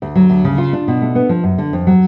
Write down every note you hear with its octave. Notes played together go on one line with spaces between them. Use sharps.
D2
F#3
D2
C#3
F4
D4
B2
A3
B3
F3
F#2
D3
F2
F#3